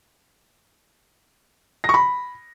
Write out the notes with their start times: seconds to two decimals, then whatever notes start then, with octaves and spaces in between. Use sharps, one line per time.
1.84 A#6
1.89 C#6
1.94 B5